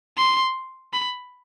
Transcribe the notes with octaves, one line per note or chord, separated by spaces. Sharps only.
C6
B5